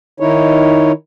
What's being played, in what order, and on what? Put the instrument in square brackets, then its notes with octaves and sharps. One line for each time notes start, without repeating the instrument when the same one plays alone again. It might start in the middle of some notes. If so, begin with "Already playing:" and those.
[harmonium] D#3 D#4 E4 C#5